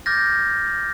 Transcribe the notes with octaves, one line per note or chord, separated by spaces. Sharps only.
D6 F6 G6 A6 A#6